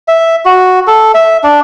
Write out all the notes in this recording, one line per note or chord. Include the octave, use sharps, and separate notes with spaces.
E5
F#4
A4
E5
D4